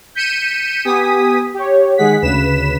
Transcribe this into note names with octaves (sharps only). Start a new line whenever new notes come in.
G6 B6 C#7 D#7 E7
B3 G4 G#5 D#6 B6
G4 C#5
D#3 G#3 G#4 F#5 B6
D2 C#3 B4 B6 E7